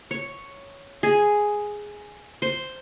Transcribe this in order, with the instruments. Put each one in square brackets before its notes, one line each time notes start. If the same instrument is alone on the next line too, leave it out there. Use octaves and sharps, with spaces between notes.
[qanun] C#5
G#4
C5